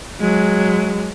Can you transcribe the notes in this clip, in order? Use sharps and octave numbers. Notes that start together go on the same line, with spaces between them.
F#3 G#3